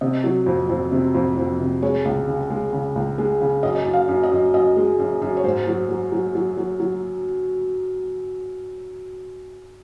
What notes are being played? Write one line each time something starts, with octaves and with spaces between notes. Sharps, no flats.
C3 D#5
F#3
F2
F2
C3
F2
F2
C3
G#3 C#5
C#2
C#3
G#3
C#3
C#2
G#3
C#3
F#2 D#5
F#2
F5
F#2
D#5
F#2
F#2 D#5
G#3
F#2
F#2
C#5
G#2 C5
F#3
F#3
F#3
F#3
F#3
F#3